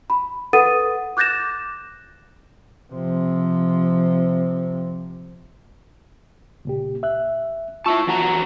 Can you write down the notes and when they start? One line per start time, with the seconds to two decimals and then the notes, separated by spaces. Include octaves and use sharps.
0.10 B5
0.53 A4 B4 F#5 D#6 A6 D#7
1.17 D6 F#6 G6 A6 A#6 E7
2.93 C3 F3
6.65 C#2 A#2 G4
7.03 E5 F#6
7.86 E4 F4 E5 A5 C#6 E6
8.07 E2 F#4 A#5